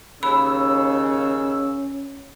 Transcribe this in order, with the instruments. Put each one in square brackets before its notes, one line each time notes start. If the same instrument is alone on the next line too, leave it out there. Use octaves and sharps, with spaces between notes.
[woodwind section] D#2 E6 [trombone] C#3 [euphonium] C#4 [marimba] B5